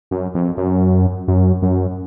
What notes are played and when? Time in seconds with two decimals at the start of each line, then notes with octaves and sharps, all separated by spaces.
0.11 F#2
0.34 F2
0.57 F#2
1.28 F#2
1.62 F#2